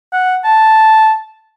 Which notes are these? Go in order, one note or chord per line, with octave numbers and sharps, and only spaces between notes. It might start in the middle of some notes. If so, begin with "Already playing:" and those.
F#5
A5